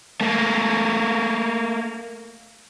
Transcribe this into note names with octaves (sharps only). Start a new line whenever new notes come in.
A3 A#3